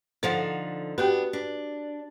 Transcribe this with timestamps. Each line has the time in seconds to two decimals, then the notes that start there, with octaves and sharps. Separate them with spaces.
0.23 D3 F3 D#4 A4 F#5 A6
0.98 B3 D4 F#4 G4 G5
1.33 D4 B4